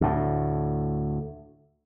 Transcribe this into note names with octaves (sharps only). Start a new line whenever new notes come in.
D2 A2